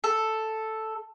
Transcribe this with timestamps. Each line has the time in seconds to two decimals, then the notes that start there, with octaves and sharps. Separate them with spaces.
0.04 A4